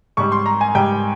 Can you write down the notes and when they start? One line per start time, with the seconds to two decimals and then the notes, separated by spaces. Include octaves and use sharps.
0.17 G#2 G3 C#6
0.32 C6
0.46 A#5
0.61 G#5
0.75 G#2 G3 G5